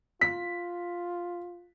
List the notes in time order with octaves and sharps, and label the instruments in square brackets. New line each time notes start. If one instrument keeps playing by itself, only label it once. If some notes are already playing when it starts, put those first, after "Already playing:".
[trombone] F4 [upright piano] B6